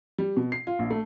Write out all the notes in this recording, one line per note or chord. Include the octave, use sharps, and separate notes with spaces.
G3
B2
C7
F4
A#1
A3